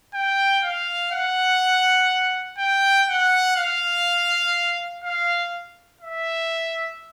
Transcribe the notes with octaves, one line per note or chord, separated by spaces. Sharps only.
G5
F5
F#5
G5
F#5
F5
F5
E5